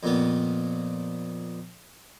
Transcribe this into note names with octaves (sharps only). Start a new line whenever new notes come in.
F2 A#2 B3